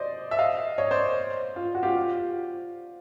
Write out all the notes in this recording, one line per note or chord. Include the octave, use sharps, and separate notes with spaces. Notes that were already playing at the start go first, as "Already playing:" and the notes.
Already playing: C5 D5 D#5
E5
D#5 F5
C#5 D#5
C5 D5
F4
F#4
F4 G4
F4